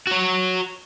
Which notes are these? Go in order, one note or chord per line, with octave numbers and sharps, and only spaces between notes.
F#4 C#5